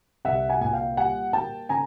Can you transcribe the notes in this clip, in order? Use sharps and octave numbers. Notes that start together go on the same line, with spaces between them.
C2 E5 F#5
F#5 G#5
A#2 G#5
F5 G5
G3 F#5 G#5
A#3 G5 A5
C#3 G#5 A#5